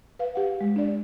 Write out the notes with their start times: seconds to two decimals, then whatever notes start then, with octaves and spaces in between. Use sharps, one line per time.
0.19 B4 F5
0.35 G4 F#5
0.61 G#3
0.76 D4 D5